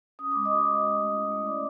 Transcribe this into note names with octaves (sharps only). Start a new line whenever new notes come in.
C#4 D#6
G#3 D6
D#5 D#6
F#4
G#3
C#4
A3
E4
A3
C#4 D5 D6